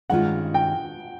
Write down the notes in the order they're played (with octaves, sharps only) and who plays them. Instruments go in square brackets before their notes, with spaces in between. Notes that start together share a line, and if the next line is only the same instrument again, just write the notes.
[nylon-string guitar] G2 D#3 G#3 C#4 F4 [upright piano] F#5
[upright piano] G5